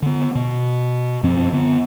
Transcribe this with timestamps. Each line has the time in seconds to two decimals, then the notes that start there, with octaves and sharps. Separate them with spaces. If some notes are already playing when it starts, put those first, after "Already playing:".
0.02 D3 B3
0.35 B2
1.23 F#2 F3 C4
1.52 D3 B3